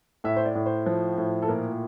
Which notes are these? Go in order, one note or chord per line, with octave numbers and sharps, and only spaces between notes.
A2 E5
C5
D5
A2
C5
F3
A2
A4
A#2 A#4